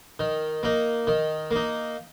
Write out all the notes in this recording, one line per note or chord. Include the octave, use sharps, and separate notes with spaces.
D#3
A#3 D#4
D#3
A#3 D#4